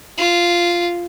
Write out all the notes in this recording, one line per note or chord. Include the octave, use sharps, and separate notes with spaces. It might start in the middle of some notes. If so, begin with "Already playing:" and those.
F4